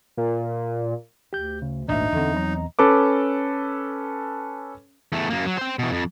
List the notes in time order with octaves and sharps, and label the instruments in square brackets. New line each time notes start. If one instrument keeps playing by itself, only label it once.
[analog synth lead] A#2
[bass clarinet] D2 [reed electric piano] G4 G6
[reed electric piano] C#3
[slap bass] G#1 A#2 D#3 [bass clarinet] D2 [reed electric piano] D4 E5 [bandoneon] D#4
[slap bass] E2 C4 [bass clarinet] D3
[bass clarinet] F#3 [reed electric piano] D#5 A#5
[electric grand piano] C#4 A4 B4 D6
[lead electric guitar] E2 A3
F#2 A#3
F#3
C5 G5
B2 E3
F2